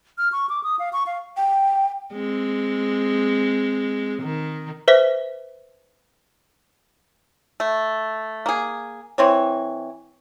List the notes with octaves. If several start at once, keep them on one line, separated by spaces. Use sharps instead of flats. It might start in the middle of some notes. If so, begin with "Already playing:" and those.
F6
C#6
D6
D#6
F5
C#6
F5
G5
G#3 C4
D#3
B4 C5 E5 B6
A3
A#3 G#4
E3 C4 C#5